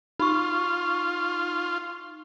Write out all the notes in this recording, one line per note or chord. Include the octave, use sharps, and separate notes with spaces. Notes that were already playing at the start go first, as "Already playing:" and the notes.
D#4 F4 C#6